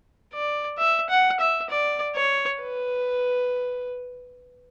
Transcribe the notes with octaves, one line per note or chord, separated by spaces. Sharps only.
D5
E5
F#5
E5
D5
C#5
B4